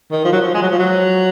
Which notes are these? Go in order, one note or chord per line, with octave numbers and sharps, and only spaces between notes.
D#3
F3
F#3
F3
G#3
F#3
F3
F#3